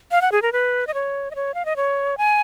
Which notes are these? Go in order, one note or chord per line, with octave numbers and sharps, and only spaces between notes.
F5
F#5
G#4
A#4
B4
D#5
C#5
D#5
C#5
F5
D#5
C#5
G#5